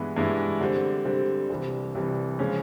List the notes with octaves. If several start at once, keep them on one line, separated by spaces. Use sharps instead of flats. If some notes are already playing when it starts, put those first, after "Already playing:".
Already playing: G2 E3 G#3 B3 E4
G2 E3 G#3 B3 E4
D3 G3 C4
D3 G3 C4
C2 C3 E3 G3
C2 C3 E3 G3
C#3 F3 G#3 C#4